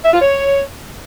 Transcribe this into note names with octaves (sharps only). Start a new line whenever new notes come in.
E5
F4
C#5